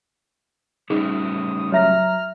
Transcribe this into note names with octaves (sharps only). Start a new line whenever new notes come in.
G3 A3 C#4 D#4 G#4 D#6
F#3 C#5 E5 A#5 F6 A#6